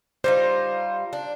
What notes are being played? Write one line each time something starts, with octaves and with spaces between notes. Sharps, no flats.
G3 D#4 F4 C5
D4